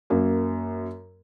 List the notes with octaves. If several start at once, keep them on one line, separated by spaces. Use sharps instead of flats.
F#2 A#3